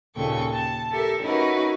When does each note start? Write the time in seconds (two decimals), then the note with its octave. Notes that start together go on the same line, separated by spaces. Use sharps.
0.15 D#2 A#2 C#3 A4 G5 C#6
0.53 A5
0.90 G4 A4 A#4 E5
1.20 C#4 D#4 E4 F#4 A#4 B4